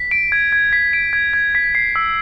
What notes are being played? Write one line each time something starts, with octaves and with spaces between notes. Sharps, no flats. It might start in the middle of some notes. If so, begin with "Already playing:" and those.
Already playing: B6
D7
G#6
G#6
B6
D7
G#6
G#6
B6
C7
E6